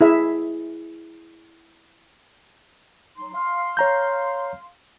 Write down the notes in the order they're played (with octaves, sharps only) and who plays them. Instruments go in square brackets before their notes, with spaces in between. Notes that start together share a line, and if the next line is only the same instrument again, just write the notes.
[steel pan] E4 G#4 E5
[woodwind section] F#3 D#4 C6
F5 C6
[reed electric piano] C#5 A#5 G6